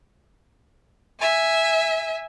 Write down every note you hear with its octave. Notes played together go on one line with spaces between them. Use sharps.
E5 G#5